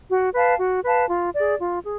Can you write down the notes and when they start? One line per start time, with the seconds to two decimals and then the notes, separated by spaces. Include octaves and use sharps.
0.10 F#4
0.35 B4 F5 A5
0.60 F#4
0.85 B4 F5 A5
1.09 F4
1.34 G#4 D5
1.59 F4
1.83 G#4